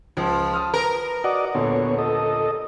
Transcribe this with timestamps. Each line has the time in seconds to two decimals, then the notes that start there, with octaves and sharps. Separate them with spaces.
0.17 C#2 F3
0.53 A5 D#6 F6
0.74 A#4 B4
1.24 F#4 D5 D#5 F#5
1.55 D#1 A#2 D3 B3 C#5
1.99 A4 D#5